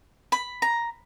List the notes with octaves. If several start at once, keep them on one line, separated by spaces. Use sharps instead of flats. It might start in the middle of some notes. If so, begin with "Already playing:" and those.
B5
A#5